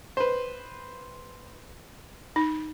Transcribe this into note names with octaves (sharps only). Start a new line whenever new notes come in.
B4 C5
D#4